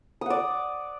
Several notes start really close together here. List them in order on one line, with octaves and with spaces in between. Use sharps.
D#6 F#5 D5